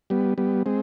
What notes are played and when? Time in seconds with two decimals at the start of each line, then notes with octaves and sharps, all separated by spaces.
0.10 G3 B3
0.38 G3 B3
0.66 G#3 C4